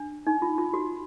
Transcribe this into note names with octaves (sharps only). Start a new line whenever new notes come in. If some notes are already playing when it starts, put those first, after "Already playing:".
Already playing: D4
D#4
F4
F4
F#4